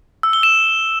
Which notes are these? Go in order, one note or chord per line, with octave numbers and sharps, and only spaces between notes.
E6
G7
E7